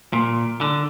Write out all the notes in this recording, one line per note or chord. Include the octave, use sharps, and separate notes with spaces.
A#2
D3